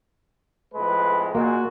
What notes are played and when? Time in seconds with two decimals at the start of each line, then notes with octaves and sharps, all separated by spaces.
0.74 F2 A2 G#3 B4
1.35 A#2 G#3 A#3 F#4